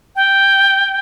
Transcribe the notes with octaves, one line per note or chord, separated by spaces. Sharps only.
G5